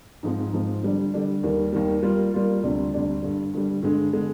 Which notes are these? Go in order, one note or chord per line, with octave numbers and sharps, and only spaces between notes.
G#2 F3 G#3 C4
G#2 F3 G#3 C4
D3 G3 D4
D3 G3 D4
D#2 D#3 G3
D#2 D#3 G3
G3 A#3 F4
G3 A#3 F4
D2 C3 G3 D4
D2 C3 G3 D4
G2 D3 G3
G2 D3 G3
G2 D3 G#3
D3 G#3